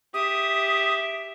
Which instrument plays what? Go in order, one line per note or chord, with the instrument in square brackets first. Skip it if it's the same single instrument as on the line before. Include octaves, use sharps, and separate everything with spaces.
[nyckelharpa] G4 E5 [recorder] D#6